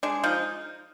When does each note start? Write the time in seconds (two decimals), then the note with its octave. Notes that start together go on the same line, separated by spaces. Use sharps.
0.03 G#3 D4
0.24 F3 D#4